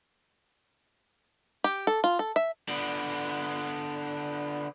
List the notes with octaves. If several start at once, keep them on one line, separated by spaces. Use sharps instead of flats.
G4
A4
F4
A4
E5
D3 B3